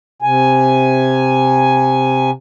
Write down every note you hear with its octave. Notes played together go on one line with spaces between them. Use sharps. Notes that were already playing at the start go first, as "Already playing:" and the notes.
C3 G#5